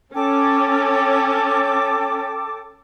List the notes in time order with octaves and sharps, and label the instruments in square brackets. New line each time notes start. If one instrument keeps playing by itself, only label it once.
[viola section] C#4 [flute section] A4 G5 D6